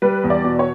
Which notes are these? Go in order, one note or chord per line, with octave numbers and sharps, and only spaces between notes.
G3 B4
E2
D5
B2
C#5